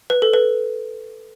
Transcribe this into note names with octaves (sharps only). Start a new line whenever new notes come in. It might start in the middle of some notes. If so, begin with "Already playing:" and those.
B4
A4
B4